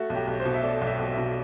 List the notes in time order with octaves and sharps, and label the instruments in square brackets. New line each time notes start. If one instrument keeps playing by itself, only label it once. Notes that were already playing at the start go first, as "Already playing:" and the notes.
Already playing: [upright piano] A3 F#4
B1
G4
B1
C5
B2
E5
A3 D5
B1
E5
B1
E5
B2